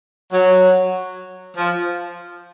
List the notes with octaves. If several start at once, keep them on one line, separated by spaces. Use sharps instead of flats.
F#3
F3